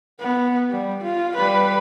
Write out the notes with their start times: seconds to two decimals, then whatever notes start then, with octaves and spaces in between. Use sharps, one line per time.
0.19 B3
0.70 G3
1.03 F4
1.36 G3 B4